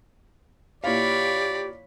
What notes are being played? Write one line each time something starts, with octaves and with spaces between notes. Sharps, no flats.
A#2 E4 G4 C#5 D5 F5 B5